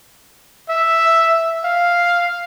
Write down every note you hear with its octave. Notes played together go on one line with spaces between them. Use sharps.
E5
F5